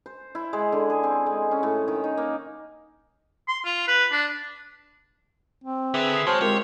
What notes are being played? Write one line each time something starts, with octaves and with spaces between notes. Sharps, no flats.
C5
E4
G#3
D3
G#4
C4
G#3
C#4
A2
D#3
D#4
A#3
C6
F4
B4
D4
C4
D3 G#4 B4 E5
D#6 C7
G#3 F#4 C5 C#5 A5 F6
G#3 C4 F4 G4 A#4 C#5